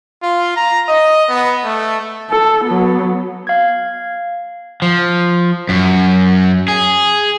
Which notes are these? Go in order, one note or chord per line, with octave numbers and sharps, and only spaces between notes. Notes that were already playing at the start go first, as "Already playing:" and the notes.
F4
A#5
D#5
B3
A3
A4
F#3 B3
F5 G#6
F3
F#2
G#4